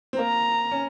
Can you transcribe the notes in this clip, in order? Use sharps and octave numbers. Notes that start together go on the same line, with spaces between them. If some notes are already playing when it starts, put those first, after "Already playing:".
C4
A#3 A#5
C#4